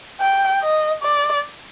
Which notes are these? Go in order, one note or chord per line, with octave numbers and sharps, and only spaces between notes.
G5
D#5
D5